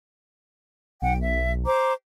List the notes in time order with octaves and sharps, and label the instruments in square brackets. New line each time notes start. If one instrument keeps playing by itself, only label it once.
[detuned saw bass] B1 [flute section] F#5 G5
[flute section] E5
C5 A#5 D6